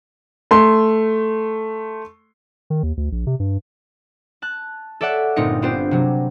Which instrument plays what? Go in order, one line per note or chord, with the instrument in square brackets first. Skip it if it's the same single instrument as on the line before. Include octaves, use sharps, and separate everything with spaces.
[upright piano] A3 C6
[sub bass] D#3
D#2
D2
A#1
C3
G2
[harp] A5 F#6
A4 C#5 D5 E5 F#5
G1 A#2 C4 D#4 C#7
B3 C4 D4 F4 G4 C5
C3 F#3